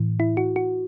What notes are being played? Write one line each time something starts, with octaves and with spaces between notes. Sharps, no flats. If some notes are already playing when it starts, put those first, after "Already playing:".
Already playing: A2 E3
E4
F#4
F#4